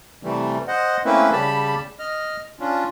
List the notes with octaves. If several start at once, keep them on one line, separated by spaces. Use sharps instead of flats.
C3 E3 G3 A3
C5 D#5 F#5
A3 A#3 C4 C#4 E4 B4
C#3 G3 G4 A5 B5
D#5 F6
C#4 D4 F4